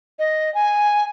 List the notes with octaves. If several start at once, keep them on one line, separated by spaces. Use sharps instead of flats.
D#5
G#5